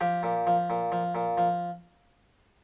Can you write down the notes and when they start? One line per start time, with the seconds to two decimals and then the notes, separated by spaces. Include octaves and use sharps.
0.01 F3 G4
0.23 A#2
0.47 F3
0.70 A#2
0.92 F3
1.15 A#2
1.38 F3